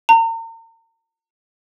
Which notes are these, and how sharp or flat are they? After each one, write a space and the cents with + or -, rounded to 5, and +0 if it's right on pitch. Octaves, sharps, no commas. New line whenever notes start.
A#5 -40